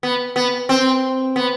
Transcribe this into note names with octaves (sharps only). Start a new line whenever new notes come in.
B3
B3
C4
B3